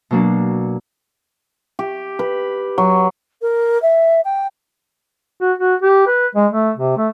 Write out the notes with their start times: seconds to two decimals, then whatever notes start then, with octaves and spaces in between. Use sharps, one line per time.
0.11 B2 F#3 A#3 D4
1.79 G4
2.19 B4
2.78 F#3
3.42 A#4
3.82 E5
4.24 G5
5.41 F#4
5.59 F#4
5.82 G4
6.07 B4
6.35 G#3
6.52 A3
6.77 C3
6.97 A3